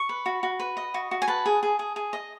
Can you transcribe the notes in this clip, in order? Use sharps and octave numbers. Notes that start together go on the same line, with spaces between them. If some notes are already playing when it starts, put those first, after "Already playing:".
Already playing: C#6
B4
F#4
F#4
B4
D#5
F#4
F#4
G#5
B4 A5
G#4
G#4
G#4
G#4
D#5